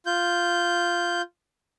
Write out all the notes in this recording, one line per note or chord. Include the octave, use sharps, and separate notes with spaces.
F4 G6